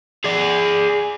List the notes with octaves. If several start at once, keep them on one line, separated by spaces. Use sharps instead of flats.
G#4 D5